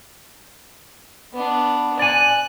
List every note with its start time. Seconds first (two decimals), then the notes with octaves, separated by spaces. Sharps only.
1.33 B3 D4
1.99 D5 G#5 F#6